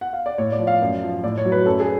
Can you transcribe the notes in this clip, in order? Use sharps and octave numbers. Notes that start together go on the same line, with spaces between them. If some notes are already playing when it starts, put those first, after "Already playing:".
F#5
F5
D5
A2 C#5
D5
F3
F5
F#2
F3
A2 D5
C#5
F#3
B4
F#2 A4
G#4